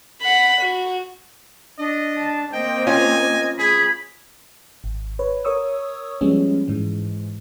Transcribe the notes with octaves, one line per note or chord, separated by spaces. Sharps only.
F#5 B5
F#4
D4 D#5
A5
A#3 C4 D#5 G5
C#4 F4 G#5
G#4 B5 G#6
G#1
B4 C#5
A#4 C#5 C#6 D#6 E6
F3 G3 G#3 B3 C#4
G#2 E3 G#3